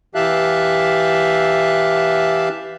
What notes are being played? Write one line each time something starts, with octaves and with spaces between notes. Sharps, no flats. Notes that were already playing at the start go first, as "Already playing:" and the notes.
E3 G4 E5 F5 A5 F#6